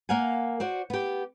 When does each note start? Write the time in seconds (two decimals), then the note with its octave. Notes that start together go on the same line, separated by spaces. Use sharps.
0.09 A#3 A#4 F5 F#5 G#5
0.60 F#4 C5 D5
0.90 B3 G4